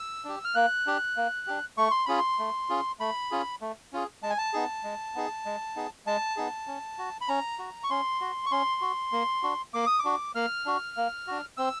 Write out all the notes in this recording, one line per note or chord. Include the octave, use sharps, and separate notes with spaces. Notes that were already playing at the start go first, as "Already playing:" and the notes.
Already playing: E6
D4 G4
F6
A#3 F#6
D4 G4
A#3
D4 G4
A3 C#6
C6
C#4 F4 G#4 B5
C6
A3
C#4 F4 G#4
A3 B5
C#4 F4 G#4
A3
C#4 F4 G#4
G#3 A5
G#5
A5
B3 D#4 G#4
G#3
B3 D#4 G#4
G#3
B3 D#4 G#4
G#3 A5
B3 D#4 G#4
C#4
F#4
B5
C#4 A#5
F#4
C#6
C#4 C6
F#4
C#6
C#4 C6
F#4
A#3
D4 F#4
A#3 D6
D#6
D6
D4 F#4
A#3 F6
D4 F#4
A#3
D4 F#4
C4 E6